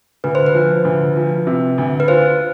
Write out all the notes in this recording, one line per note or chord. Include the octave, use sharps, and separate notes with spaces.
D2 B4
C5
B4
F3
D2
F3
C3
D2
B4
F4 C5